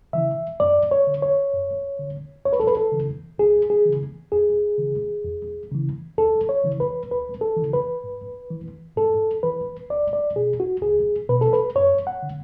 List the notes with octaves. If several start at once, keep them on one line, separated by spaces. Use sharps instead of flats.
C#3 E3 E5
F#2 D5
C#5
D3
C#5
F#2
D3
C#2 C#5
B4
A4
B4
A4
C#3 E3
C#2 G#4
G#4
C#3 E3
E2 G#4
C#3 E3
E2
C#3 E3
D2 A4
C#5
C#3 E3
B4
D2 B4
A4
C#3 E3
B4
G#2
E3
G#2 A4
E3 B4
C#2 D5
D5
B2 G#4
F#4
C#2 G#4
B2 B4
A4
B4
F#2 C#5
F#5
D3